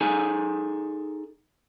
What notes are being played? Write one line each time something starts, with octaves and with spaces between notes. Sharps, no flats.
D#4 G#4 A4 G#5